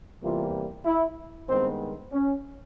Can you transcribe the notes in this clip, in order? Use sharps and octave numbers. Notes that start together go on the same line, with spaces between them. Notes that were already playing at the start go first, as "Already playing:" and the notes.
E2 C3 E3 G3 A#3 F4
E4
G2 D#3 G#3 B3 C4
C#4